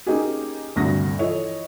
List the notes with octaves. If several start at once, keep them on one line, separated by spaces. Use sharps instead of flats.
A#3 C#4 D#4 G4 G#4
D2 G2 C3 F#4 A#6
E3 F3 A4 C#5 D#5